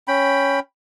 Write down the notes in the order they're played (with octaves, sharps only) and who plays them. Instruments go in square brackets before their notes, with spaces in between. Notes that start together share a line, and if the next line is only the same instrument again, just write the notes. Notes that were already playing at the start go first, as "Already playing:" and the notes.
[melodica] C#4 G5 B5